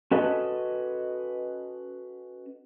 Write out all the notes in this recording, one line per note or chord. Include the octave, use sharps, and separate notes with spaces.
C#4 F#4 A4 B4 D#5